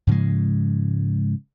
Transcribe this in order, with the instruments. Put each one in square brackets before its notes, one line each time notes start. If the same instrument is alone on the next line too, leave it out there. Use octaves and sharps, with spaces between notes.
[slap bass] G#2 C#3 F3 G#3